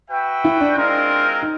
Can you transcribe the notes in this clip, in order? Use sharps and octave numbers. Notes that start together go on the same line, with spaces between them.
F#4 B4 E5 G5
E4
D4
G#3 C4 D4 F4 A#4
D#4